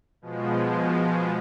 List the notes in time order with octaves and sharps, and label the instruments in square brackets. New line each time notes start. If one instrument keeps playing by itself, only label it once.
[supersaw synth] B2 F3 G#3